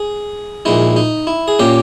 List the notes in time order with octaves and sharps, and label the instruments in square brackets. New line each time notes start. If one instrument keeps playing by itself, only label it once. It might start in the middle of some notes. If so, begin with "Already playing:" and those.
Already playing: [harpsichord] G#4
A#1 A#2 G#3 D#4 E4
D#4
E4
G#4
A#2 A#3 C#4 G4